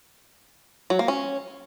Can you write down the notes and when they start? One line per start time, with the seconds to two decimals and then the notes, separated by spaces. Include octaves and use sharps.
0.90 F#3
0.99 A#3
1.08 C#4